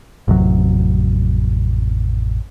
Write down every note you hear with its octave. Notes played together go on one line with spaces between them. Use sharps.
A1 F2 C3 F#3